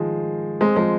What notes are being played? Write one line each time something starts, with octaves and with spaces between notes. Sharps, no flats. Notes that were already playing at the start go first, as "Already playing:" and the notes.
Already playing: D#3 F3 G#3
G#3 C4
F3 G#3